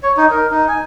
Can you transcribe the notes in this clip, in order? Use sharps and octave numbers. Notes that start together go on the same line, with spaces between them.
C#5
D#4
A#4
D#4
G#5